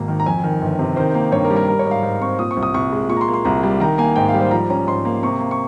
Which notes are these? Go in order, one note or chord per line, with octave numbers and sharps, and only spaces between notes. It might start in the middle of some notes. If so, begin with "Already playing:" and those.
Already playing: G#1 G#2 A#3 A#5
D#3
A#5
F2 G#5
D#3
G1
C3
D#3 C5
A#3
G2 C#5
A#4
G3
A#4
G3 A#4
C#5
G#2
F5
G#2
C4 C#6
A#2 D#6
C#6
C2
D#6
C2 C#6
G#3
A#2 C#6
A#5
C6
A#3
C6
C2 A#5
G3
D#3 A#5
A#3 G#5
G#2 G5
F5
G3
C5
F3 A#5
C#4 A#5
G#2 C6
A#3
C3 C#6
A#3
C#6